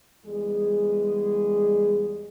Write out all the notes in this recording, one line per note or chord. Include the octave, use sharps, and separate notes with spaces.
E2 G3 G#3 G#4